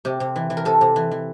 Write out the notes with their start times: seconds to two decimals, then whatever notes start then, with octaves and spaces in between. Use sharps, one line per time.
0.05 C3 G4
0.20 C3
0.36 E3
0.50 E3
0.57 A#4
0.65 C3 A4
0.81 C3
0.96 E3
1.11 E3